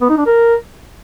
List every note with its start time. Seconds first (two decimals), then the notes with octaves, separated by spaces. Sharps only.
0.01 B3
0.10 D#4
0.18 D4
0.26 A#4